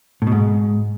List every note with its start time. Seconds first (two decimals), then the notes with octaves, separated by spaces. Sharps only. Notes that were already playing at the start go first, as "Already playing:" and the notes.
0.22 A2
0.27 B2
0.32 G#2